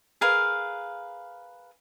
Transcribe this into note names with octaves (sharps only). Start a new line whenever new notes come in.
G#4 A#4 B4 F5